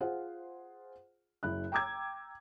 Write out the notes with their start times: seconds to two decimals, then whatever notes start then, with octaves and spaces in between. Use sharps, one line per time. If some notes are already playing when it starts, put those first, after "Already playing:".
0.01 F4 G#4 C5 F#5
1.43 F#1 E4 F#6
1.72 G5 A#5 D6 E6 G#6